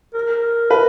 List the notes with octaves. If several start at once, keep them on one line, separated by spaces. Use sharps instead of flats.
A#4
B4